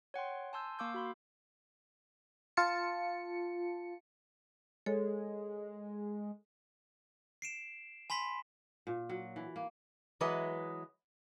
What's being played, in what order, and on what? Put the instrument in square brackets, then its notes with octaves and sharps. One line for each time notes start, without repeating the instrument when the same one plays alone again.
[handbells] C#5 F#5 G5 C6
G#5 A5 C6 E6 G6
A#3 F5 C#6 D6 E6 G6
F#4 B5 C6
[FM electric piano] F4 A5 C#7
[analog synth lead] G#3 [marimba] A4 C#5
[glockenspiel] C7 D7 E7
G#5 B5 C6 B6
[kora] A#2
F#3
E3
A#3
[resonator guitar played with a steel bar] E3 F#3 G#3 B4 D#5